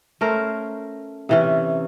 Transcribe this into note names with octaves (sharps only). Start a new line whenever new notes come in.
A3 C#4 A#4 C5
C3 E3 C#4